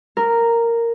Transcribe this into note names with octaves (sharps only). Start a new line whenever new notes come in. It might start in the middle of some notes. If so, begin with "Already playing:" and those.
A#4